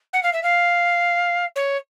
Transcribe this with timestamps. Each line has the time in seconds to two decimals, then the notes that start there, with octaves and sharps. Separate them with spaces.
0.13 F#5
0.23 F5
0.33 E5
0.43 F5
1.55 C#5